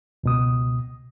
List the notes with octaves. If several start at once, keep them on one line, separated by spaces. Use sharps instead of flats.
C#2 B2 D#6